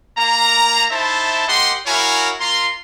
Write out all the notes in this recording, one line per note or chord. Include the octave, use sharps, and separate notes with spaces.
A#3 A#5
D#4 E4 C5 E5 A5
A#3 G4 D#5 F#5 C6
E4 F#4 A#4 C#5 F5 G#5
A#3 F4 A#5 C6